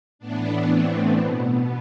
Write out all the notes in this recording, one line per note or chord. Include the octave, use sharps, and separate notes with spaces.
A2 E3 B3 D4
A3 C4
B2 B3